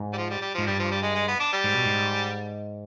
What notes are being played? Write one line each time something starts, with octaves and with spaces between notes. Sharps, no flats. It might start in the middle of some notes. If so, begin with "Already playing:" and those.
Already playing: G#2
G3
F3
G3
G3
F3
G#2
G2 G3
F3
G3
G#3
G#3
B3
D4
G3
G#2
B2
G#2